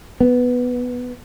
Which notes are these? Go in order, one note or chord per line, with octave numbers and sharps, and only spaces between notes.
B3